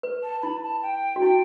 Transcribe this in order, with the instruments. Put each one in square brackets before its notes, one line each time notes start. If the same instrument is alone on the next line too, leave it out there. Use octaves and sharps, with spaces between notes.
[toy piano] B4
[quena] A5
[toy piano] E4 [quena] B5
[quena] A5
G5
[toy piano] F#4
[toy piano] E4 [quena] G5